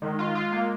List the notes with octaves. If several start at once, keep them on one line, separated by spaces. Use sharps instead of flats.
D#3 G#3
F4
F4
A#3